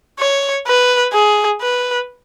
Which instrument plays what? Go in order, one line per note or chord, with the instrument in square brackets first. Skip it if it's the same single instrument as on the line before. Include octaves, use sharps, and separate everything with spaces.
[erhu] C#5
B4
G#4
B4